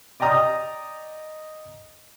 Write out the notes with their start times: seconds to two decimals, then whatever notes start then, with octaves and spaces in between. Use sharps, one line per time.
0.20 D5 D#5 G5 A#5 D#6